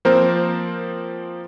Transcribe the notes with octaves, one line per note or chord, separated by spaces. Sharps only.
F3 A#3 C4 A#4 C5